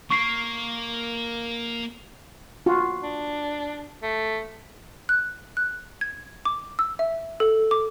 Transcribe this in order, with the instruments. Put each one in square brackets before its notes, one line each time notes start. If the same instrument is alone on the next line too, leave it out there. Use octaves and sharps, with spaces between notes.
[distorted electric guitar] A#3 [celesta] C#6 C7
[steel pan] F4 F#4
[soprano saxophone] D4
A3
[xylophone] F#6
F#6
G#6
D6
E6
E5
A4
D6